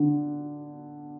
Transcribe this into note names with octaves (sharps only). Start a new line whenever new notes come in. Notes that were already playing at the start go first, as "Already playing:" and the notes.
Already playing: D3